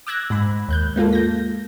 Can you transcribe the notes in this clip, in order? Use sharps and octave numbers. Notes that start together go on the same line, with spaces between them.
D6 E6 F#6 G#6 A#6
G#2 B5
D#2 F#6 G6
G#3 A#3 F4 A4
G6 A#6